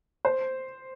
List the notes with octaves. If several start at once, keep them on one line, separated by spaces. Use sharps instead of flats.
C5